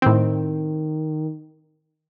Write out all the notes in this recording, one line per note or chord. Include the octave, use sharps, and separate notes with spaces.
A2 D#3 C4